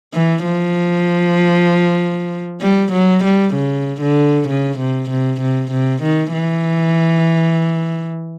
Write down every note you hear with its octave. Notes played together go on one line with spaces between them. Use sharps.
E3
F3
G3
F#3
G3
C#3
D3
C#3
C3
C3
C3
C3
D#3
E3